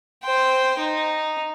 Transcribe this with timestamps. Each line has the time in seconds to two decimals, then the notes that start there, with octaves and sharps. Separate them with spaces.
0.23 C5 G5
0.79 D#4